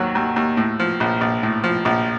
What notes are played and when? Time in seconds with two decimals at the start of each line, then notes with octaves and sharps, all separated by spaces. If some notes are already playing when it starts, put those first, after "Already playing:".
Already playing: D#2 D#3 F#3 F#4
0.15 D#2
0.36 D#2
0.57 A2
0.79 F3
1.00 A#1
1.21 A#1
1.43 A2
1.64 F3
1.85 A#1